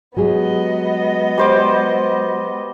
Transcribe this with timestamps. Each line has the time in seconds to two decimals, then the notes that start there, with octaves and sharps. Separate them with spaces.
0.17 F#3 G#3 B3 G4 G#4 D#5
1.38 G3 C5 D6